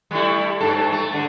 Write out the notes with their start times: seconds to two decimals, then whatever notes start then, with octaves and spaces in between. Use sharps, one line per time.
0.11 G3 A3 E4
0.61 G2 A4
0.92 A3
1.13 D3